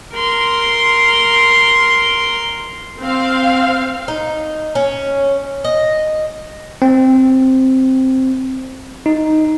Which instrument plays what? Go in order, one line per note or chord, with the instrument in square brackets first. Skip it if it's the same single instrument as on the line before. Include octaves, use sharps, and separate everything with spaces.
[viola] A#4 C6
[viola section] C4 F5
[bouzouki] D#4
C#4
D#5
[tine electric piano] C4
D#4